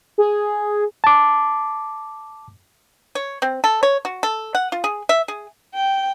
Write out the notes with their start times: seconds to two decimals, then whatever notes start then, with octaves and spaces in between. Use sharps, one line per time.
0.18 G#4
1.04 A5 D6
3.15 C#5
3.42 C4
3.64 A4
3.83 C#5
4.05 F#4
4.23 A4
4.55 F#5
4.72 F4
4.84 G#4
5.09 E5
5.28 G#4
5.75 G5